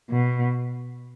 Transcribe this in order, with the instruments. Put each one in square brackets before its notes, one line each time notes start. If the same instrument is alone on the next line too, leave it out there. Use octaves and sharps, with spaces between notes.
[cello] B2